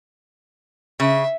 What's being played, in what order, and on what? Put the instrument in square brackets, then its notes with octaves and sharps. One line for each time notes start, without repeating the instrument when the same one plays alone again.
[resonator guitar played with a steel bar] C#3 [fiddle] E5